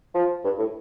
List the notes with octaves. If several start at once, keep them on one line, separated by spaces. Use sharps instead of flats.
F3
G2
A2